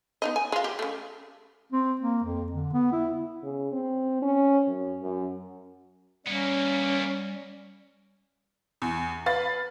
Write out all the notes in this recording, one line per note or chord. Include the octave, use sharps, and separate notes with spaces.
B3 D#4 D#5
G#5
G#3 F4
G4
C#3 A3
C4
A#3
F2
D3
B3
E4
C#3
C4
C#4
F#2
F#2
G3 A#3 B3 C#4
E2
B4 F5 B5 A6